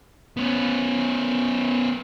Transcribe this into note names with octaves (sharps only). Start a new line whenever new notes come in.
B3 C#4